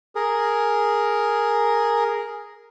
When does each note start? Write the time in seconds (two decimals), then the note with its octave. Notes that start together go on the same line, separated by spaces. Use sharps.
0.15 G#4 A#4